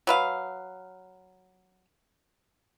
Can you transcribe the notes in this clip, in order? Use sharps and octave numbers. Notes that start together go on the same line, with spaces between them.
F#3 B4 F5